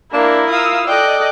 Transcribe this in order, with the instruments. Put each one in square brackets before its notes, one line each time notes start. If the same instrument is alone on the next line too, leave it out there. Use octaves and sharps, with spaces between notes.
[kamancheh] A#3 [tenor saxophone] D4 [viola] E4 A#4
[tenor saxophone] F4 [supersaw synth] F5 E6 [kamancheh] D#6
[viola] A4 D5 [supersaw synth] D#5 [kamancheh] G5 F#6